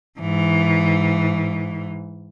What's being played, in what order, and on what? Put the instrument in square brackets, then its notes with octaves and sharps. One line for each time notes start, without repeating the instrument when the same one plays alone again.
[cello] G#2 E3